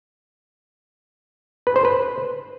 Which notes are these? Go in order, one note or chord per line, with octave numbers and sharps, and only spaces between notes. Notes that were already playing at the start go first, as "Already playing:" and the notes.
B4
C5
B4